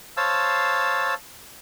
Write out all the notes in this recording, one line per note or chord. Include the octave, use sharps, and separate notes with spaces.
C5 C#5 F5 A5 E6